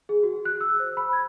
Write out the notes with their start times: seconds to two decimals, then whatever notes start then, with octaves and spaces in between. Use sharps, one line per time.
0.09 G#4
0.23 F#4
0.45 F#6
0.61 E6
0.80 C5
0.97 B5
1.13 G#6